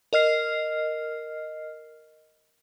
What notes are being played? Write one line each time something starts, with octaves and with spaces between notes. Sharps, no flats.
A#4 D#5 F6 C7